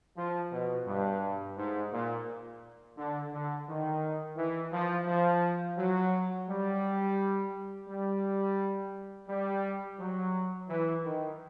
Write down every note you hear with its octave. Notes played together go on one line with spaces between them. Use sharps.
F3
B2
G2
G#2
A#2
D3
D3
D#3
E3
F3
F3
F#3
G3
G3
G3
F#3
E3
D#3